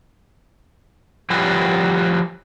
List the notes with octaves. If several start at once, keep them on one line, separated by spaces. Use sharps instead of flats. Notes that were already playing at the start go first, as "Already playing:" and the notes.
F3 G3 F4 F#4 B4 C#5